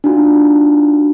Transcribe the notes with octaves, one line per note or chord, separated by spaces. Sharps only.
D4 D#4 F4 F#4